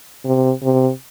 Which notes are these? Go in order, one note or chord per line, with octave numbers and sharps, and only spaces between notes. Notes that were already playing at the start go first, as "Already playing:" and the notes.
C3
C3